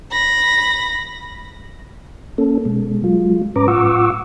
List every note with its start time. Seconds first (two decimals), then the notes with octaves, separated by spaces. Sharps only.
0.11 B5 A#6
2.38 A#3 C#4 A4
2.65 B2 G#3
3.04 F#3 G#3 F4
3.56 G#2 C#4 B4 A#5 D6
3.68 A2 F4 F#5 C#6 D6 E6